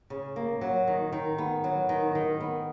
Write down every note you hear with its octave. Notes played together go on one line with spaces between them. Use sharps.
C#3
A#3
F#3
D#3
D#3
B3
F#3
D#3
D#3
B3